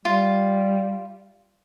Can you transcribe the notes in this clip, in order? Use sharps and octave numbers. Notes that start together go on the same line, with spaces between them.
G3 F4